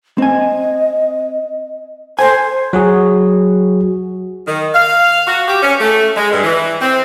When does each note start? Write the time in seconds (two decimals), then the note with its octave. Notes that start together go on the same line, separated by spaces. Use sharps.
0.18 C4 D#5 G#5
2.19 A4 C5 G#5
2.73 F#3 F#4 G#4
4.47 D#3
4.75 F5
5.27 F#4
5.48 G4
5.63 C#4
5.80 A3
6.17 G#3
6.32 G2
6.44 E3
6.81 C4